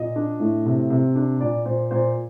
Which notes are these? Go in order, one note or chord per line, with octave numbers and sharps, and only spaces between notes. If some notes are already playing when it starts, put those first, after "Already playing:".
Already playing: A#2 D#5
D4
A2
C3
C3
D4
A#2 D5
A#2 C5
A#2 C5